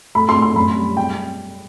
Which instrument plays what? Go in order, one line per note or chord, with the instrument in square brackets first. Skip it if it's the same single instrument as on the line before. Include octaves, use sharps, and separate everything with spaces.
[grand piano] A3 B5
C6
A3
C6
F#2 B5
G3
G5